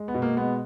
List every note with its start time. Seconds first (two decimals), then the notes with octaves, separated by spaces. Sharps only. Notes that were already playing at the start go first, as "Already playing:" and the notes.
Already playing: G#3
0.08 B3
0.14 B2
0.22 A#3
0.37 G#3 B3